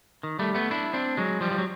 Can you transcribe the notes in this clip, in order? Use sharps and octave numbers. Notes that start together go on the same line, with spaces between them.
D#3
G3 A3
A3 B3
D4 E4
C4 D4
F#3 G#3
F3 G3
F3
F#3